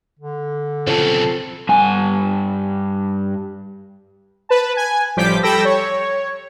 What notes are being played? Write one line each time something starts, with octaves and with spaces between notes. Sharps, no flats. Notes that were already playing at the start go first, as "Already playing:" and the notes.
D3
B1 C#3 F3 C4 A4
G2 G#5
B4 A5
G#5
A1 F3 G3 D6 G6 B6
G3 A4 G5 B5 E6 A#6
C#5